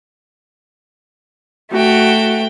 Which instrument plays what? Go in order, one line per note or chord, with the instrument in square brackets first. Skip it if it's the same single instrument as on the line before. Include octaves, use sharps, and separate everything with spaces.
[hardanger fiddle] A3 G5 [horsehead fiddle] F#4